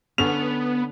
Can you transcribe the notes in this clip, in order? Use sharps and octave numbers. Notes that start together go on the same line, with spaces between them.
D3 B3 C#4 F7